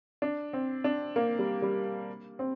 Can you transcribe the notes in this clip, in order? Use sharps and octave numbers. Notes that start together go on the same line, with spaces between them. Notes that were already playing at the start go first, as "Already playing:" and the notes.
D4
C4
D4
A#3
G3
G3
C4